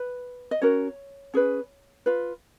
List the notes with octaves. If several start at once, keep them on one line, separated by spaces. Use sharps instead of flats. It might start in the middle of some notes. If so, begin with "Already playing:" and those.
Already playing: B4
D#5
C#4 F#4 A#4 C#5
C#4 G#4 B4
F4 B4